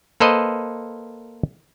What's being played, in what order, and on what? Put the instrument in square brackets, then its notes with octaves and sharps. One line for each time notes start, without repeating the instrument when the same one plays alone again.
[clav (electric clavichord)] A#3 A4 B4 C5 D#5